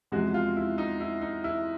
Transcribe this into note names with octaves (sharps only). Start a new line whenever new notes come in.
E2 C3 F3 G#3 F#4
F4
E4
D#4
E4
D#4
E4